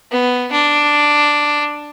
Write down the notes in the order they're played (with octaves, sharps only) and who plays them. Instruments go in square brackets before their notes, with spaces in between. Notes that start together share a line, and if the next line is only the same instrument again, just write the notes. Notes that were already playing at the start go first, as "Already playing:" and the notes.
[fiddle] B3
D4